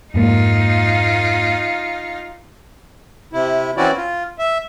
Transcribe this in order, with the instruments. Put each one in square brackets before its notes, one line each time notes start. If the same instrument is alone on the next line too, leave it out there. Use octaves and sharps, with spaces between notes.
[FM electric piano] F2 G#2 A#3 [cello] D#4 F4
[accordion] C3 E4
E3 C4 C#4 E4 F#4 D5
F4
E5